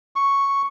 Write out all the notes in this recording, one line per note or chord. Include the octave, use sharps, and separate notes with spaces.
C#6